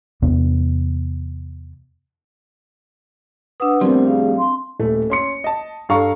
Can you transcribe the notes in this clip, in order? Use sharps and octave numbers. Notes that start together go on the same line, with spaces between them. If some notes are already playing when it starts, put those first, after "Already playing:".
E2 C3 B3
D4 B4 F#5 D#6 E6
A2 F3 G3 B3 C4 A#4 C5
G#4 F5
C6
D#1 A3
C#4 C6 C#7
D#5 A5
G2 A4 F5 A#5 C#6